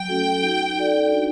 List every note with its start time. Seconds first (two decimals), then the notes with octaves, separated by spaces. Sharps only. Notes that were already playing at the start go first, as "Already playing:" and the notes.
Already playing: F#3 G5
0.08 A3 C#4 F#4 A4
0.43 D#4
0.77 F#4 A4 D5
1.12 D4